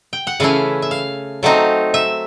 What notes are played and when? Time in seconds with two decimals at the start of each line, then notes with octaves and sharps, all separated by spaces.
0.13 G5
0.27 F#5
0.40 C#3 E3 A3 C#4 E4 F5
0.82 E5
0.91 F5
1.43 F#3 A3 C4 D#4
1.94 E5